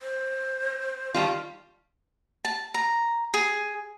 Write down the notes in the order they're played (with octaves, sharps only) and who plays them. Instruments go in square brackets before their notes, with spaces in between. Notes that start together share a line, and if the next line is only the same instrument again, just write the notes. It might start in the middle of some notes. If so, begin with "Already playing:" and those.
[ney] C5
[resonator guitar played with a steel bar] D#3 G3 F4 [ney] A5
[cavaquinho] A5
A#5
G#4